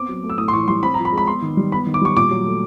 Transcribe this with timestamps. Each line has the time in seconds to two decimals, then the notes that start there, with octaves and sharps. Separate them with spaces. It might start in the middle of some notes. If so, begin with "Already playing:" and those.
Already playing: B3 C4 D6
0.09 F#3
0.23 A3
0.30 E6
0.38 A2 D#6
0.48 C6
0.53 E3 C#6
0.68 G3 C6
0.82 C4 B5
0.94 F3 A#5
1.05 B5
1.12 G#3
1.18 B5
1.27 B3 C6
1.42 D#3
1.57 G3
1.72 B3 B5
1.87 D#3
1.94 D6
2.01 G3 C#6
2.16 A#2 D6
2.31 F#3
2.46 A3